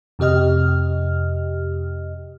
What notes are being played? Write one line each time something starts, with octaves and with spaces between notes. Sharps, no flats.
F2 C3 G4 D#5 F6